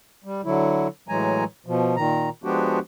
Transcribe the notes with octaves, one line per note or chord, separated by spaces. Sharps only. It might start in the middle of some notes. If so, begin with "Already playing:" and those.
G3
D3 F#3 E4
A2 E3 F#3 G#3 G#5 A#5
B2 F3
A#2 D#3 A#5
F3 G#3 B3 D4 F#4 G4